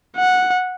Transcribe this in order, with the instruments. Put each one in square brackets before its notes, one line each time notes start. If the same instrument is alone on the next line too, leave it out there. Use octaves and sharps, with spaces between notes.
[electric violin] F#5